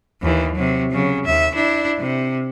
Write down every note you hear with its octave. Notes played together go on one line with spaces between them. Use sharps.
D#2 E3
C3 F#3
C#3 F#3
D#2 E5
D4 E4
C3